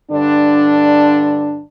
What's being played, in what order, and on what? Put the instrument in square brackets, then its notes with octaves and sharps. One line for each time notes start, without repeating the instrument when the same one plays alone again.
[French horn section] G2 D3 D4